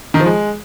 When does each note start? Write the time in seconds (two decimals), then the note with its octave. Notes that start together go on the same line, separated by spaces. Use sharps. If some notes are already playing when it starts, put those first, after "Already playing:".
0.14 D#3
0.20 F3
0.26 G#3